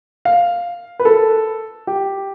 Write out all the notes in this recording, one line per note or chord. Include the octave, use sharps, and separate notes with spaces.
F5
B4
A4
G4